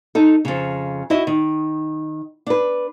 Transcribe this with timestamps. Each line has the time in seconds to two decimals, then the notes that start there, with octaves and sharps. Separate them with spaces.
0.15 D#4 A4
0.45 F2 C#3
1.10 E4 F#4 D#5 E5
1.27 D#3
2.47 D4 B4